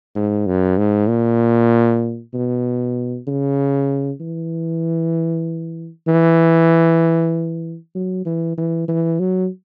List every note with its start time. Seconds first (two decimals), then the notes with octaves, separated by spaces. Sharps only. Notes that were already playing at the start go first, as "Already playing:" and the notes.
0.15 G#2
0.47 F#2
0.78 G#2
1.09 A#2
2.34 B2
3.27 C#3
4.21 E3
6.08 E3
7.95 F#3
8.26 E3
8.58 E3
8.88 E3
9.20 F#3